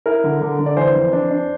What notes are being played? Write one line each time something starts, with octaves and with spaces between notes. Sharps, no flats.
E4 A#4
D3
D3
D3
D5
E3 C5
F2
D4
D4